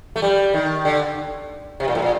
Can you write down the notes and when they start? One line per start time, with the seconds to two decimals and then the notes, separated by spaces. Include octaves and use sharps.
0.16 A3
0.22 G3
0.54 D#3
0.85 D3
1.80 C3
1.88 A#2
1.95 A2
2.02 A#2